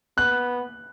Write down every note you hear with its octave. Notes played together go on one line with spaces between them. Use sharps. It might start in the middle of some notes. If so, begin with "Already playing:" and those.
B3 F#6